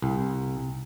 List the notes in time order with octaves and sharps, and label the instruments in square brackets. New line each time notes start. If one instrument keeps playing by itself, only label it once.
[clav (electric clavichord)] C2